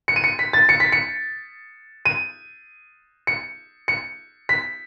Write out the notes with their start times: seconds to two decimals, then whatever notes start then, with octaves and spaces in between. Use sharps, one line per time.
0.08 C#7
0.16 D#7
0.24 C#7
0.39 B6
0.53 A6
0.69 C#7
0.80 B6
0.92 C#7
2.05 D#7
3.27 C#7
3.88 C#7
4.49 B6